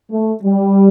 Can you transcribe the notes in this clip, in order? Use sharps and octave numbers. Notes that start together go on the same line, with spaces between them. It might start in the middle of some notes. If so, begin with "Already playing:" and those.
A3
G3